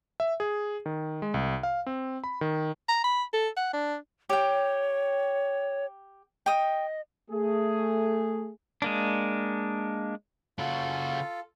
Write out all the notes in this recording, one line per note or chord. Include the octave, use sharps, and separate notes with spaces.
E5
G#4
D#3
G#3
C2
F5
C4
B5
D#3
A#5
B5
A4
F#5
D4
G4 C#5 G5
D#5 G5 D#6
A3 G#4
G#3 A#3 D4
C#3 F4 F#4 A4